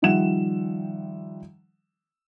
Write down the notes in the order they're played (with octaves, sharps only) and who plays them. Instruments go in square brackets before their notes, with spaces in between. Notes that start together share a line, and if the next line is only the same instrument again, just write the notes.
[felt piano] D#3 F3 G3 E5 F#5 E7